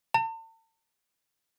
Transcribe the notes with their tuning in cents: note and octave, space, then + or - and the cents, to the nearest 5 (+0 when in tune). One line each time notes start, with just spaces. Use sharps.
A5 +40